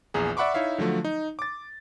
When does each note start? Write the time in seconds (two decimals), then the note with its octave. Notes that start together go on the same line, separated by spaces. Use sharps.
0.14 A#1 E2 G#4
0.37 D5 E5 F#5 B5 C#6 D6
0.54 D#4 E4 C#5 E5 F5
0.78 D3 F3 F#3 A3
1.05 D#4
1.39 D6 A6